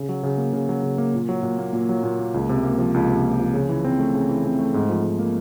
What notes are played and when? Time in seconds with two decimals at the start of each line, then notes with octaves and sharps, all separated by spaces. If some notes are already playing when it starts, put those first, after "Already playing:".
Already playing: C#3
0.09 F#3
0.23 C#3
0.38 A#3
0.53 C#3
0.69 F#3
0.83 C#3
0.98 A#3
1.14 A#2
1.29 F#3
1.43 A#2
1.58 A#3
1.73 A#2
1.89 F#3
2.03 A#2
2.19 A#3
2.34 C#2
2.49 C3
2.63 A#3
2.78 F3
2.94 C#2
3.09 C3
3.23 A#3
3.39 F3
3.53 C#3
3.69 E3
3.85 C4
3.99 A3
4.14 C#3
4.29 E3
4.45 C4
4.59 A3
4.74 G#2
4.89 F3
5.04 G#2
5.19 A#3